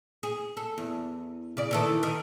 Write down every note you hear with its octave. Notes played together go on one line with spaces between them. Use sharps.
G#4
A4
E2
C#3 D5
D#3 E3 A4
D#3